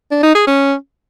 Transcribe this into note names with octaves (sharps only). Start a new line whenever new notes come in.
D4
D#4
G#4
C#4